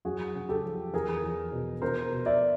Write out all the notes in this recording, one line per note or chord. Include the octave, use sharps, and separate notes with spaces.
F#2 F#4 G#4
C#3
G4 A4
F3
E2 G#4 A#4
E2
B2
B2 A#4 C5
B2
D5 E5